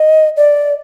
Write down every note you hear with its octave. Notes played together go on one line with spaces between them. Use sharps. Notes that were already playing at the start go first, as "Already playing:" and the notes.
Already playing: D#5
D5